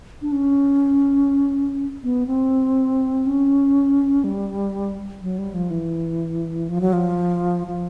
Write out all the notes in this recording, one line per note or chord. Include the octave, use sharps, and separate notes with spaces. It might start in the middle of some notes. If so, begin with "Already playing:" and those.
D4
C#4
B3
C4
C#4
G3
F#3
G3
F3
E3
F3
F#3
F3
F3